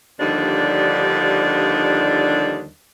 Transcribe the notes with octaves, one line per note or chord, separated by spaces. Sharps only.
D#2 D3 F3 G3 D4 D#4